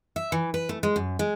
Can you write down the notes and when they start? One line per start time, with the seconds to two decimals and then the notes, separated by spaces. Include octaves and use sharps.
0.16 E5
0.32 E3
0.54 B4
0.69 A3
0.83 G#3
0.96 F#2
1.19 G#3